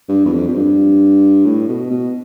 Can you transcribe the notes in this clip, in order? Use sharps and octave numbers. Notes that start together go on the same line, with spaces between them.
G2
E2
F2
F2
G2
A2
B2
B2